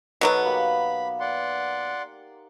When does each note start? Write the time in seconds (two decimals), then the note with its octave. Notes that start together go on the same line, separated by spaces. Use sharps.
0.21 B2 F#3 B3 D#4 A4
0.45 A#3 G4 B5
1.20 D5 F#5 C6